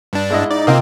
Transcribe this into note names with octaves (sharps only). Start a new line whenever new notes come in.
G2 D4
G#2 E4 D#5
D#4 D5
C3 A#3 C4 F4 D#5